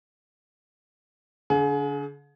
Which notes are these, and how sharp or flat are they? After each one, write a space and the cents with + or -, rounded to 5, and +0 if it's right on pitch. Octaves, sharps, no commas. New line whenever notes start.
D3 -35 G#4 +30